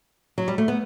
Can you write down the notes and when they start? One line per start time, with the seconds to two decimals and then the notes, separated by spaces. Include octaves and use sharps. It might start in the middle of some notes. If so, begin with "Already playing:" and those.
0.38 F#3
0.48 G3
0.58 A3
0.68 B3